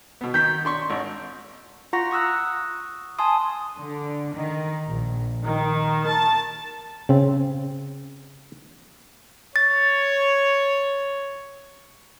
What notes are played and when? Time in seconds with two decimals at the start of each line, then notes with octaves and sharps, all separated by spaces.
0.21 B2 B3
0.34 D#3 G6 B6
0.65 D4 C6 C#6
0.90 G#1
1.93 F4 F#5 A#5 C#6 A#6
2.11 C#6 D#6 E6 F#6
3.19 G#5 A5 C6 D#6
3.77 D3
4.32 D#3
4.88 A#1
5.44 D#3
6.05 A5
7.09 C#3 C4
9.56 C#5 A6